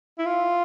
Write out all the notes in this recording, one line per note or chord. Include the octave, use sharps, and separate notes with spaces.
E4
F4